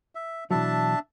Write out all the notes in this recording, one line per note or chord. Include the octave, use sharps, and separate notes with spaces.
E5
B2 E3 F#3 D4 E5 A5